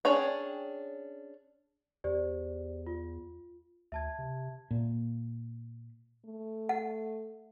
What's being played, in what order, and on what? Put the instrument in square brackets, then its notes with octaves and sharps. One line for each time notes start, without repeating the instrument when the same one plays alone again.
[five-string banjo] C#4 D4 G#4 C#5 G5
[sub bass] E2 [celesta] G4 C5 D5
[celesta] F4
[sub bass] D2 [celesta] E5 A5 G#6
[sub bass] C3
[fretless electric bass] A#2
[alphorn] A3
[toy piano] F#5